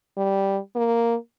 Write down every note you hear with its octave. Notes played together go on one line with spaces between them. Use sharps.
G3
A#3